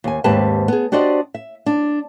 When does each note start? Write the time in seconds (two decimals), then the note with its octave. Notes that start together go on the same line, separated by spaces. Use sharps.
0.04 D#2 G#5
0.24 D#2 G#2 C4 G4 B4 A5
0.68 B3 G#4
0.92 D4 F#4 G4 C5 D5 D#5
1.34 E5
1.66 D4